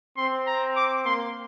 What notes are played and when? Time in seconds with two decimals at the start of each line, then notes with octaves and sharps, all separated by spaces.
0.17 C4 C6
0.47 A#5
0.77 D6
1.05 A#3 C6